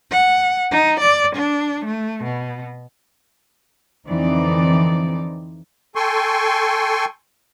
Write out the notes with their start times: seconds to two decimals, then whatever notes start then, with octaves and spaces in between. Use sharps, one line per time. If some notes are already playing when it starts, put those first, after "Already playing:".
0.11 F#5
0.71 D#4
1.00 D5
1.36 D4
1.85 A3
2.23 B2
4.08 F2 D3 E3 C4 D#4 D5
5.95 A4 G5 G#5 C6 C#6